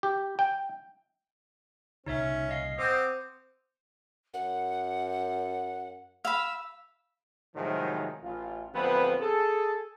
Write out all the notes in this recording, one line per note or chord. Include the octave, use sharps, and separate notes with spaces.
G4
G5
C2 A#2 C#3 C#4 D#4 C#5 E5
D#5 F5 C7
C4 C5 F#5 D6 D#6
F#2 F#5
F5 B5 E6
A2 C3 D#3 F3 F#3 G#3
A1 F4
A1 D3 F3 B3 C4 B4
G#4 A4